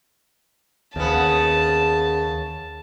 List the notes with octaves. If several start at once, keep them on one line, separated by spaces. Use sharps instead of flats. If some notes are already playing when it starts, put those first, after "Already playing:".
D#2 C#3 B3 A5